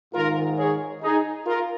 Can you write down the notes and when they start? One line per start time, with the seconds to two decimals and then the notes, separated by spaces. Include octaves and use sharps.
0.14 G#2 D#3 F4 A#4
0.58 G#4 C#5
1.02 D#4 G#4
1.46 F4 A#4